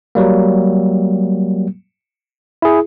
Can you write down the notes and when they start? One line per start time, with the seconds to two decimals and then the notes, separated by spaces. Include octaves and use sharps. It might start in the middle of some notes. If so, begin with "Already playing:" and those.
0.15 F#3 G3 A#3
2.62 E4 G#4